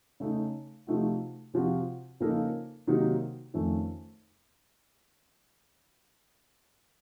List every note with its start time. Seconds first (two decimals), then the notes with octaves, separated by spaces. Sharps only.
0.20 C#3 A3 D#4
0.87 C3 F3 A3 D#4 F#4
1.54 C3 F3 C4 F#4
2.20 C#3 F3 A#3 D#4 A4
2.87 C3 D#3 F#3 A#3 D#4
3.54 F2 D#3 A3 C#4